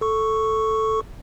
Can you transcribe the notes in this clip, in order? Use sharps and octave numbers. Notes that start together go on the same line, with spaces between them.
A4 C#6